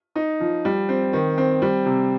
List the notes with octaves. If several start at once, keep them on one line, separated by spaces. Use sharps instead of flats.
D#4
F3
G3
C4
D#3
C4
G3
C3